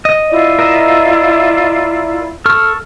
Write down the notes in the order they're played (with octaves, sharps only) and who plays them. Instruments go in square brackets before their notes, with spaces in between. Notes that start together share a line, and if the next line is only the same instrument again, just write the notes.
[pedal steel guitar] D#5
[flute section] E4 F4 D5
[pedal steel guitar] A#4 D#5 E5
A4 C#6 F6